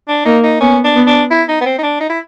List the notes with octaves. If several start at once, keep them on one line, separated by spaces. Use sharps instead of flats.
D4
A#3 D#4
D#4
B3 C#4
D4
B3
D4
E4
D#4
B3
C4
D#4
D4
D#4
E4